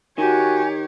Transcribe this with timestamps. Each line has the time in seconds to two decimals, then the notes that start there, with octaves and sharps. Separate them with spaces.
0.18 D#3 F#4 G4 C#5 G#5